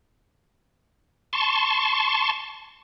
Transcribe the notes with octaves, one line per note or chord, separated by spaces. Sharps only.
A5 C6 C#6